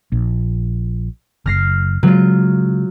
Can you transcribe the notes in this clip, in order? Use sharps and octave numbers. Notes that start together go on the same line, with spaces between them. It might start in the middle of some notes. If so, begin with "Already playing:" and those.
A#1
F#1 F6 A#6 C7
C#3 F#3 G#3 F4